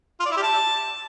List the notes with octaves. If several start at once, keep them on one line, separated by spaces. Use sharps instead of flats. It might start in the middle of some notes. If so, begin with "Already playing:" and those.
F4
D5
E4
G4
A5